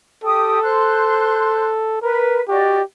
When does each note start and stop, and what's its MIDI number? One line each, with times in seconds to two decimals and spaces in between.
0.24 0.58 67
0.24 2.01 69
0.24 0.58 79
0.24 0.58 87
0.63 1.69 72
0.63 1.69 84
0.63 1.69 90
2.02 2.41 70
2.02 2.42 71
2.48 2.78 66
2.48 2.83 67
2.48 2.78 74
2.48 2.78 75